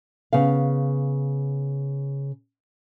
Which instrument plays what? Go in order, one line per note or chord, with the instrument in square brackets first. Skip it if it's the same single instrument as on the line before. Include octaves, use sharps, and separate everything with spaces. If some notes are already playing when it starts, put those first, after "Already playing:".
[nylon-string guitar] C#3 B3 F5